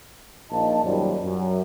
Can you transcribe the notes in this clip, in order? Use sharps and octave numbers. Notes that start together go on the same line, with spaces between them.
A#1 A#2 D#4 D#5 A5
F#2 A#2 D#3 G3 C5 D5
F#2